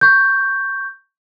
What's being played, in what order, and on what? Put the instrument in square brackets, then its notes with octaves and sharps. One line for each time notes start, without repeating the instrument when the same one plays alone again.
[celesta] C#6 G6